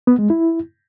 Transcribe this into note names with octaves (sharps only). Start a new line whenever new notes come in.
B3
G#3
E4